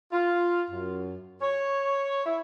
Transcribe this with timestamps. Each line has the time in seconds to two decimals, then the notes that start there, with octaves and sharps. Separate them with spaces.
0.12 F4
0.71 F#2
1.41 C#5
2.25 E4